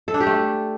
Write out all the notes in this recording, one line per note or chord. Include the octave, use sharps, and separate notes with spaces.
A4
D4
G4
A3